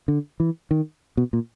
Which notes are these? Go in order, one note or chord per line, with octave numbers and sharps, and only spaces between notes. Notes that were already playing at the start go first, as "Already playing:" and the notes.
D3
E3
D#3
B2
A#2